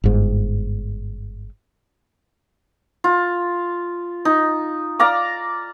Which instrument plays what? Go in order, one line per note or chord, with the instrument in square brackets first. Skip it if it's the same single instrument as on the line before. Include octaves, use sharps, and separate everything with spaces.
[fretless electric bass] G1 G#2
[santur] F4
D#4
D5 F5 A#5 D6